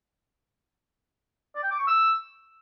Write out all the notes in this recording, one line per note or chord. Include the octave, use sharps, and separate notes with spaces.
D5
G5
D6
C#6
E6